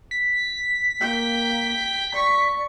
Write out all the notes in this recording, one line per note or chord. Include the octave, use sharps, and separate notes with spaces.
B6
A#3 G5
D5 C#6